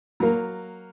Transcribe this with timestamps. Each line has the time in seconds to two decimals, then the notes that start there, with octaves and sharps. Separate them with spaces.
0.20 F#3 A#3